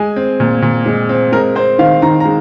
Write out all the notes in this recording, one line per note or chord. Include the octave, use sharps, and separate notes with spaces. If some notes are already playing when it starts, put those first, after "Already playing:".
Already playing: G#3 G#5
C4
A#2
A#2
G#3
C4
G#3 A#4
C4 C5
D#3 F5
D#3 A#5
A#5
G#3